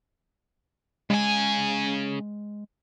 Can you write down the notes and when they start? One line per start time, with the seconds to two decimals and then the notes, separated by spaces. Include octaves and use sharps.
1.10 C#3 G#3 G#5